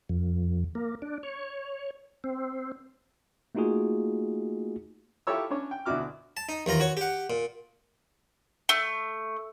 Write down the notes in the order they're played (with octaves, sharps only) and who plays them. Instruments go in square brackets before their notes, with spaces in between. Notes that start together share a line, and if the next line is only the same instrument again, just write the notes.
[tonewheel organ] F2
A#3
D4
C#5
C4
[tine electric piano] A3 A#3 D#4 F4 F#4 G#4
[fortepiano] E4 F4 G4 A4 C#5 E6
C#4 D4 C#5
G5
D2 B2 E4 F#4 D6 F6
[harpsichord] A5
D#4
D#2 E3 F4 A#5
F#4 C#5
G4 F#5
A#2
[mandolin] A3